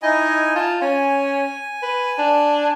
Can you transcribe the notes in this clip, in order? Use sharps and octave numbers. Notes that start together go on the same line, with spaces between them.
D#4 E4 D#5 G#5
F4 A5
C#4 G#5
B4
D4